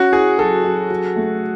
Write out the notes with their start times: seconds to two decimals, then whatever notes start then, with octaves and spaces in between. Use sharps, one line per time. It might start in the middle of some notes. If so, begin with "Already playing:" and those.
Already playing: C#4 F#4
0.12 E4 G#4
0.39 F#3 A4
0.64 F#3
0.90 F#3
1.16 A3